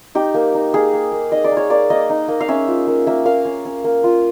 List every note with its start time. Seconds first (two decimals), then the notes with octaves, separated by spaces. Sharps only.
0.15 D#4 G4
0.34 A#3
0.54 D#4
0.74 A#3 G#4
0.93 A#3
1.12 A#3
1.32 D#4 D#5
1.44 D5
1.52 A#3
1.57 C#5
1.70 A#3 D5
1.90 A#3 D#5
2.10 D#4
2.28 A#3
2.40 F5
2.48 C#4 E5
2.68 F4
2.87 A#3
3.07 A#3 E5
3.25 A#3 F5
3.45 C#4
3.65 C#4
3.84 A#3
4.04 F4